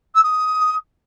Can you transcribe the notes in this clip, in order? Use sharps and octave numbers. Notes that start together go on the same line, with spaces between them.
E6
D#6